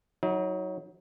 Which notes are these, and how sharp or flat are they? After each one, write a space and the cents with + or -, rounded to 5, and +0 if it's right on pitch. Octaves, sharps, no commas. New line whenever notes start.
F#3 +0 D#4 +35